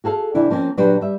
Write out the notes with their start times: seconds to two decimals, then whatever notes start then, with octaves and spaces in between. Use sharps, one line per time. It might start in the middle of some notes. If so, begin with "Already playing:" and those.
0.04 F#4 G#4 A4 F5
0.34 C3 E3 D4 E4
0.50 F3 A#3 C4 C#4
0.77 A#2 F#3 D4 F#4 G4 B4
1.01 G3 E5